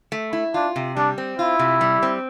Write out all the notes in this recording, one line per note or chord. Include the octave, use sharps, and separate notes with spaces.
A3
E4
D4 F4
C3
G3 D4
C4
E4 F4
C3
G3
C4